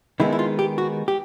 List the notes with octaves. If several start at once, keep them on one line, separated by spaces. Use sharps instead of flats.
D#3 G#3 B3 E4
E4
F4
G4
F#4
G4